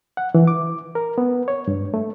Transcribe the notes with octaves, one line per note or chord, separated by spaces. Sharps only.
F#5
E3
D6
A#4
B3
C#5
G2
A3